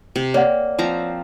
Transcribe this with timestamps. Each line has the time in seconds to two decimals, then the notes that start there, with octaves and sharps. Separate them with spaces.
0.16 C3
0.34 A#3 C#5 D5 F#5
0.79 F3 C4 A#5